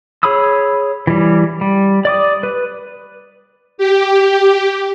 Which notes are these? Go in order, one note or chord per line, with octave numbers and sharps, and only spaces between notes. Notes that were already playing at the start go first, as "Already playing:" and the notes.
G#4 C#5 B5 D#6 E6
E3 G3
G3
D5 D6 D#6
B4
G4